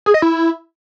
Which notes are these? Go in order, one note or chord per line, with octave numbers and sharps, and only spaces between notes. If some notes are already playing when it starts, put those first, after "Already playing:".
G#4
D#5
E4